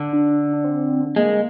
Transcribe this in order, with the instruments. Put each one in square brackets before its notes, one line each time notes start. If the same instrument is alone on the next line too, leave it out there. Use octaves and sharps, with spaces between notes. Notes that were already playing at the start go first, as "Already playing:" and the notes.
Already playing: [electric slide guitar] D3
[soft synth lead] D4
D4
C4
[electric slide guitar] G#3 [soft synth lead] A#3